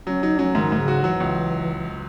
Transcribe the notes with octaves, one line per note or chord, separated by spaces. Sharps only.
F#3 C#4
F#3 D#4
F#3 C#4
G#2 D#3
G#2
C#3
F#4
E3 F#3
C#2